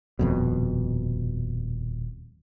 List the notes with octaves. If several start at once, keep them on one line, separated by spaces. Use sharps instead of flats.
D#1 F2 B2